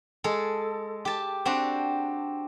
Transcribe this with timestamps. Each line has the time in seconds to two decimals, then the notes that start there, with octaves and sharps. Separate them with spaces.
0.24 G#3 A4
1.05 G4 A5
1.46 C4 D4 F#4 G4